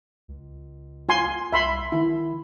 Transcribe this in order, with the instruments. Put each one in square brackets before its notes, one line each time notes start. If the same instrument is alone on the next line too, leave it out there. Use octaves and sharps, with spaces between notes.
[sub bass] C#2
[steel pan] F4 G#5 C6
[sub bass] C2 [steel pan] E5 B5 C6
[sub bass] D#3 [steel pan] E4